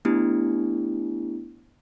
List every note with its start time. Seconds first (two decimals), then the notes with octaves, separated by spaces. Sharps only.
0.05 A3 B3 D4 E4 G4